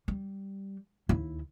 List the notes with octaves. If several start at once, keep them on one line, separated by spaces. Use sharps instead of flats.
G3
D#2 E4